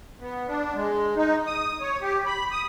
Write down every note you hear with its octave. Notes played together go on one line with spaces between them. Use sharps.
B3
D4
G#3
D#4
D#6
C#5
G4
B5
D#6